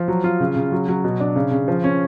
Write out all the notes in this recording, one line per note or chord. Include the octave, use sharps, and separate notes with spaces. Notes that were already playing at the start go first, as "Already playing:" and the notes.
Already playing: F3
F#3
F4
C#3
C#3
F#3
F#3
B2
D4
C#3
C#3
F3
C#4